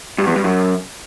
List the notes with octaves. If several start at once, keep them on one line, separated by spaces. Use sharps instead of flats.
G2
E2
G2
F#2